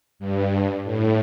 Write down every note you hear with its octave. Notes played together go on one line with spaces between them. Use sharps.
G2
A2